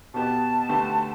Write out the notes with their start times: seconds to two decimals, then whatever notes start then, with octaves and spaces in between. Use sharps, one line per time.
0.14 B2 B3 G4 A5
0.69 D2 D3 A3 G4 B4